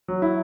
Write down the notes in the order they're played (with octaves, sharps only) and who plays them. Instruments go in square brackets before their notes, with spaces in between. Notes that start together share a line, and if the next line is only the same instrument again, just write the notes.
[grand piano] F#3
E4